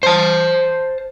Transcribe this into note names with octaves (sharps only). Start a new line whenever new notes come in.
C5 A5